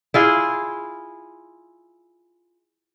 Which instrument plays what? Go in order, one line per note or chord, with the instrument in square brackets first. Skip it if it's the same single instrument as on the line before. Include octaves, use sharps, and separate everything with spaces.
[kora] E4 F4 G#4